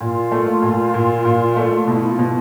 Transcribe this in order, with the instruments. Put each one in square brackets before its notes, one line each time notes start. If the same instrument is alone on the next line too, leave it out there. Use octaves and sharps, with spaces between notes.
[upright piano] A#2 [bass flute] F4
[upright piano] A3
A#2
A#2
A#2
A3
[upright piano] B2 [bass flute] E4
[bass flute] E4
F4
[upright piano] B2